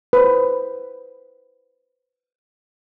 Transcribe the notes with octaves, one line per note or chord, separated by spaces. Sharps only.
B4 C5